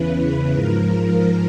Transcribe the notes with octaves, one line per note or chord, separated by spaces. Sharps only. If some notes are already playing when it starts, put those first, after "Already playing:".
Already playing: E2 C#3 E3 B4
G#2 F3 A#4